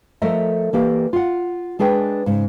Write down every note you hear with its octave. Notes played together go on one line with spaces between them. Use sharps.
F3 A3 A4 A#4 D#5 E5
E3 A#3 G4 D5
F4 F#5
G#3 D4 G#4 B4 G5
G#2 C#3